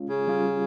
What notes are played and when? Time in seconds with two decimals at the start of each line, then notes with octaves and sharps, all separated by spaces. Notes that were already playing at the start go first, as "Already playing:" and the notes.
Already playing: G#3 C#4 F4
0.09 C#3
0.27 G3 C#4 F4